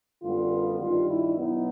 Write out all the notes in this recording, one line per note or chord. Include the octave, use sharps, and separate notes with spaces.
F#2 D3 G3 B3 F4
G2 D#3 G3 F4
E4
B2 F#3 B3 D#4 E4